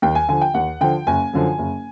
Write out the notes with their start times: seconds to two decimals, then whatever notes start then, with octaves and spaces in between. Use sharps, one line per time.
0.02 D#2 G5
0.15 G#5
0.28 D3 F3 G#5
0.41 G5
0.54 D#2 F#5
0.81 D3 F3 G5
1.07 F#1 G#5
1.33 F#2 D3 F3
1.58 F#1